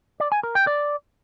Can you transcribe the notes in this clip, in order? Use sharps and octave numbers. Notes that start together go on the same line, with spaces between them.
D5
G#5
A#4
G5
D5